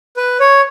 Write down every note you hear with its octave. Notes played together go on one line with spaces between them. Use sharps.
B4
C#5